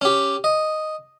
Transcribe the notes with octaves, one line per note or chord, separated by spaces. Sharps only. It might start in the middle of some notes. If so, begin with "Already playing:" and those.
C#4 G4
D#5